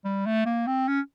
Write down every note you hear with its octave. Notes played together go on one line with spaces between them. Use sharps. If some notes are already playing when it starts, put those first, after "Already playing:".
G3
A3
A#3
C4
C#4